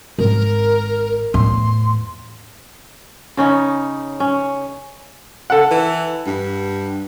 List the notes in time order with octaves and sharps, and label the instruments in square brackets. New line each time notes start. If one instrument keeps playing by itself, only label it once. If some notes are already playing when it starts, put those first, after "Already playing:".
[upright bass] G#1 [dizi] A#4
[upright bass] E2 A2 [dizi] C6
[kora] C#3 C#4 D#4
C#4
[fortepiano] A4 F#5
[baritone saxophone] E3
G2